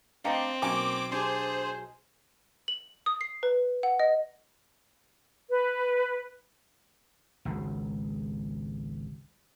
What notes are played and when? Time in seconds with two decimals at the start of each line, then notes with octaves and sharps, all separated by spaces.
0.24 A3 C4 D4 D#5 F5 G5 A#5
0.62 B1 A#3 C#4 A#4 G#5 D6 D7
1.12 D4 G4 G#4 C5
2.68 F#7
3.06 D#6
3.21 C7
3.43 B4
3.83 F#5
4.00 D#5
5.49 B4
7.45 G#1 C#2